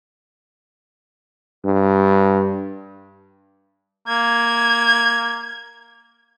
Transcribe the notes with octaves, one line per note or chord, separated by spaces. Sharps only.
G2
A#3 G#6